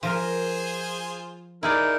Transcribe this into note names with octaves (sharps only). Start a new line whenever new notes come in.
F3 F4 G#4 A#4 C5
D#4 E4 G#4 A#4 D5